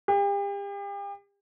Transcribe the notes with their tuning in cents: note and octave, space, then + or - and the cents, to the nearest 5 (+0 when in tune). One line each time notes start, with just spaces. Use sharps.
G4 +40